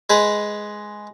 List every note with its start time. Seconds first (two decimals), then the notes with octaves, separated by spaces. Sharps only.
0.10 G#3 G#4 B4